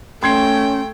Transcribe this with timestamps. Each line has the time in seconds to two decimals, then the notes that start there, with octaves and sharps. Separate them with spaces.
0.23 A3 C#4 G5 C6 G#6 C7